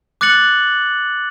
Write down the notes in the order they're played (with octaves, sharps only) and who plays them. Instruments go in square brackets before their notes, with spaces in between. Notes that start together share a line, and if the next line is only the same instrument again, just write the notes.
[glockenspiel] D6 F#6 A6 C#7 F#7